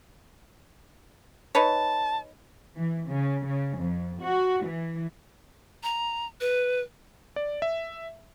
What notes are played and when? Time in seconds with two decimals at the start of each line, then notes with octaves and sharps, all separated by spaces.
1.55 D#4 B4 C#5 A5
2.77 E3
3.09 C#3
3.47 C#3
3.78 F2
4.24 F#4
4.66 E3
5.83 A#5
6.41 B4
7.36 D5
7.62 E5